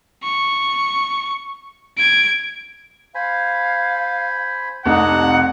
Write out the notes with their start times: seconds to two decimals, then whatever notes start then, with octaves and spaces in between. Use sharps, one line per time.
0.23 C#6
1.98 G#6 D7
3.15 C5 F5 G#5 B5
4.86 F1 C2 D4 D#4 F#5